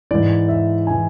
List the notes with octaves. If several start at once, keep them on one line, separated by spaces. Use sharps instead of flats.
G#2 E3 D5
E5
E3 G#5